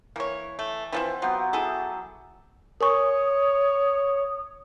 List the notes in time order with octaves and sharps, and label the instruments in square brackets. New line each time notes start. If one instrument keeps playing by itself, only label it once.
[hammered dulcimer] E3 [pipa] A#3 C#5
[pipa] A3
[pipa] E3 F3 E4 [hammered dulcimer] C4 F#5
[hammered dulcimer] F#3 B3 G4 [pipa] F4
[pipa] E4 G#4 A4
[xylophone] A#4 G#5 C#6 [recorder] C#5 [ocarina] D#6